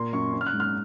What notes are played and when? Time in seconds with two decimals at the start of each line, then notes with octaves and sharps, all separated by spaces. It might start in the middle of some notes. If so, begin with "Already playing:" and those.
Already playing: A#2 A#3 C6
0.13 F#2 C#6
0.33 C#4
0.41 F6
0.47 F#6
0.53 G#2
0.60 F6